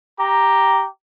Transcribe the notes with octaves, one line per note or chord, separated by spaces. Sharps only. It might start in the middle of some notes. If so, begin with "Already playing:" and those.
G4 A#5